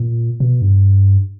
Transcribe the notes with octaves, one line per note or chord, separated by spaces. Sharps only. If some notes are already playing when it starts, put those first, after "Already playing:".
Already playing: A#2
B2
G2